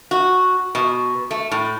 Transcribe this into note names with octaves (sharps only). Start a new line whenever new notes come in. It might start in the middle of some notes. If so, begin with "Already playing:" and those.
F#4
B2
A3
A2